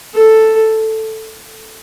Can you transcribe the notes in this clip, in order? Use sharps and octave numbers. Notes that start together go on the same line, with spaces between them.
A4